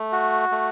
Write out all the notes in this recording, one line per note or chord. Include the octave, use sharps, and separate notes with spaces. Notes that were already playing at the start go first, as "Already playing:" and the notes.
Already playing: A3
F#4
A3